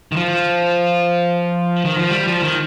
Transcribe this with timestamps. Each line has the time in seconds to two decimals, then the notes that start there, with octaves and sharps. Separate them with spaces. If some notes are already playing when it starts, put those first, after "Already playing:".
0.12 D#3
0.16 F3
1.85 D#3
1.97 F3
2.10 G3
2.27 F3
2.43 D#3